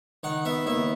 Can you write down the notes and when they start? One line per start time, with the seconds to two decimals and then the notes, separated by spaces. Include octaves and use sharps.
0.23 D#3 F#5
0.45 B3 E5
0.66 D#2 E5